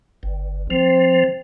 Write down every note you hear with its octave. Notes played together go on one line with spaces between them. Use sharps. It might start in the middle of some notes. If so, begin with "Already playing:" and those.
G1
F3 C4